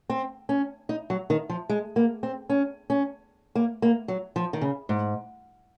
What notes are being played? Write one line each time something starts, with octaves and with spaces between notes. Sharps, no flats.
C4
C#4
D#4
F#3
D#3
F3
G#3
A#3
C4
C#4
C#4
A#3
A#3
F#3
F3
D#3
C#3
G#2